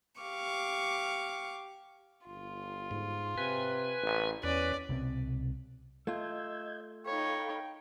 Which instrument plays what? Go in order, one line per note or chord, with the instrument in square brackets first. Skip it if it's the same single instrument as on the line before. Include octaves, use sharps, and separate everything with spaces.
[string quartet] G4 F5 C#6 D6
[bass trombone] G1 [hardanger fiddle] F4
[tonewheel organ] G#2
[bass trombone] C3 [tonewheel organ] B4 G#5
[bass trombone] A1
[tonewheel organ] E2 B4 [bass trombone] C#4 [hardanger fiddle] D5
[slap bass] C2 B2 C4
[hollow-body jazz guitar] A3 F4 [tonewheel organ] D#5 G6 G#6 [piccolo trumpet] E6
[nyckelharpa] D#4 C#5 [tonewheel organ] A4 F5 B5 [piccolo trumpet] G5